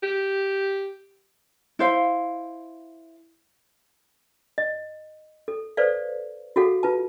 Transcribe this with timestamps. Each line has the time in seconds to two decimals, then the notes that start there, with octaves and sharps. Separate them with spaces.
0.03 G4
1.79 E4 C5 F5
4.58 D#5
5.48 A4
5.77 A4 B4 C5 D5 F5
6.56 F#4 G#4 A4 F5 F#5
6.83 F4 B4 A5